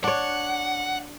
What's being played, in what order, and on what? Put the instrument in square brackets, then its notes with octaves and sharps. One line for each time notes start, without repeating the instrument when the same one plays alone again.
[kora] D4 C#5 [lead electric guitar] F#5